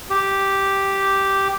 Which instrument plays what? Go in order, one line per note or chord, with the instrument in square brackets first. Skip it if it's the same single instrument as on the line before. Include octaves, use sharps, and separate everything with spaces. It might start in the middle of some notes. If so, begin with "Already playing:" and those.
[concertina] G4